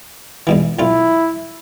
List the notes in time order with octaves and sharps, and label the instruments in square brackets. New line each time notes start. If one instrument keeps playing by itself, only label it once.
[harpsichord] E2 B2 E3
[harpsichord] B1 F4 [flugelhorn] E4